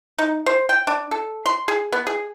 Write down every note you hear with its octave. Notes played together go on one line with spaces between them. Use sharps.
D#4
C5
G5
D4
A4
C6
G#4
B3
G#4